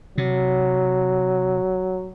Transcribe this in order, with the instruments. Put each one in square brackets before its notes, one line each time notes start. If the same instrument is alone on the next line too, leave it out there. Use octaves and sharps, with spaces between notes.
[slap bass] C3 [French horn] F#3